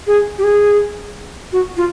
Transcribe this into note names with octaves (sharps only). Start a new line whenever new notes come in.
G#4
G4
G#4
F#4
F4